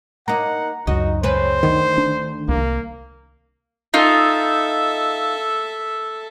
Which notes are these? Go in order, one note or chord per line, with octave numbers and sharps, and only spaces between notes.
A#3 D#4 F#5 A#5
C#2 F#2 D#4 F#4
C#3 C4 B4 C5
D2 D#3 B3
D4
C2 A#3
D#4 F4 A4 E5